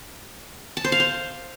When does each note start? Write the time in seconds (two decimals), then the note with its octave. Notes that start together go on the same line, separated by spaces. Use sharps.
0.77 A5
0.84 C5
0.92 F5
1.00 C5